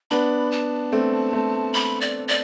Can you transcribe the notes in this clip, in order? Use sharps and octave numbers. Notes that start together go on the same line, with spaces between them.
B3 D4 B5
A5
A3 C4
A3 C4
B5
D5
D5